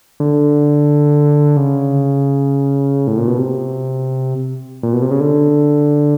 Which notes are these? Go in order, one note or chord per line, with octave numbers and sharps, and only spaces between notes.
D3
C#3
A2
A#2
B2
C3
A#2
B2
C3
C#3
D3